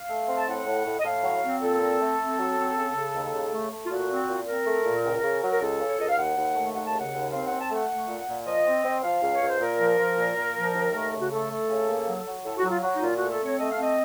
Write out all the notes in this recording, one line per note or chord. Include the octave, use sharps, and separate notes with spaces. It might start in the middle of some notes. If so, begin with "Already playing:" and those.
Already playing: F5
A3
C4
A5
A2 F#5
A2
A2
D#5
A2 F5
F#3
C4
A#2 A4
C4
A3
C4
F#3
C4
C#3
C#3
D#2
C#3
A3
A3
F4
A#2 F#4
C4
A#2
C4 A#4
A3
A#2
C#2
C#3
F#3
A#4
C#2 A4
C#3
C#5
C#2 D#5
F5
D#2 F#5
D#2
A3
D#2 F#5
A5
C#3
F#5
D#2
C4 F5
C4 F#5
A5
A3 F#5
A3
A#2
A#2
F3 D#5
C4
C4
F3 F5
C#2
C#5
C#2
C5
A#2 A#4
F3
F3
A#2
A#2
F3
D#2
A3
C#3
F#4
A3 A4
A3
C#3
A#3
F#3
F#3
A2 A4
F#4
F#3
F4
F#3 F#4
D#4
A#2 F4
F#4
A3
A4
C4 C#5
A3 D#5
F5
C4 D#5